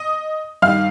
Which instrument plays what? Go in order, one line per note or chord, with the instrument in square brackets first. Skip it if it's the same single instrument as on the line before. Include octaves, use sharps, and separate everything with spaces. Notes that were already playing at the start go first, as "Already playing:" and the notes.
Already playing: [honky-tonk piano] D#5 D#6
G2 D#3 F5 F6